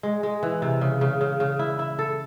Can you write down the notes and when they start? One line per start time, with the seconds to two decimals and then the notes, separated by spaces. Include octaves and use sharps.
0.03 G#3
0.23 G#3
0.43 E3
0.62 C3
0.81 C#3
1.01 C#3
1.21 C#3
1.40 C#3
1.59 E4
1.79 E4
1.99 A4